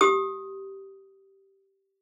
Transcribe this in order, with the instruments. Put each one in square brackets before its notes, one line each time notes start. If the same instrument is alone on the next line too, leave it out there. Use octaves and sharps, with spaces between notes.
[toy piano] G4 D#6